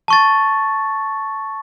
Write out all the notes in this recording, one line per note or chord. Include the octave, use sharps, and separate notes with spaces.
A5 C#6 A6